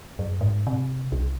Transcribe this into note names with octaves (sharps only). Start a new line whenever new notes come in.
F#2
G#2
C3
C2